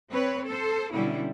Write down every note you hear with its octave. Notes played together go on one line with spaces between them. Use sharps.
C4 B4 C#5
A4 C5
B2 D3 G3 C#4 E4